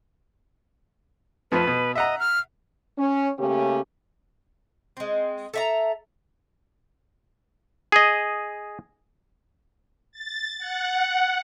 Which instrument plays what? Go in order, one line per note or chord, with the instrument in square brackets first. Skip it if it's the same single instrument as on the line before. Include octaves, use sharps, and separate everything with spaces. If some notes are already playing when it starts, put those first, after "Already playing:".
[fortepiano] F2 F3 A3 [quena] B4
[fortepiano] B2
[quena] D#5 [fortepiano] E5 F#5 A#5
[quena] F6
[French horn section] C#4
C#3 A3 A#3 C#4 G4
[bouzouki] G#3 C4
A4 E5 A#5
[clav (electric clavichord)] G#4 D#5
[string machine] A6
F#5